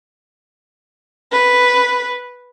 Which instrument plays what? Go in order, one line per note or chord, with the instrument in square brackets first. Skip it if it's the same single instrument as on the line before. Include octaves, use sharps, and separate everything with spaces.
[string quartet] B4